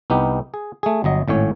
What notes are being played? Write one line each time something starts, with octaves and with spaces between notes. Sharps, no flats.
C2 B3 D#4 G4
G#4
A3 G#4
G1 F#3 D#5
G#1 A2 C#4 C#5